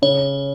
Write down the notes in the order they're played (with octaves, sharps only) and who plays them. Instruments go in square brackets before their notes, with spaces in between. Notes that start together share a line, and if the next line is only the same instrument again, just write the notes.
[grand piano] C#3 [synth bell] C#5